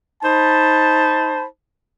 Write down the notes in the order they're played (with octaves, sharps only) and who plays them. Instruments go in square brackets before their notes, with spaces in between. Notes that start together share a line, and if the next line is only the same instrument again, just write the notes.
[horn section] D#4 C5 A5 B5